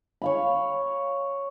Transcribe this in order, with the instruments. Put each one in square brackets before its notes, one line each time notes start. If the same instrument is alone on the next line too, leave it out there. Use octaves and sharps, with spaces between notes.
[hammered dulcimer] C#5 F5 B5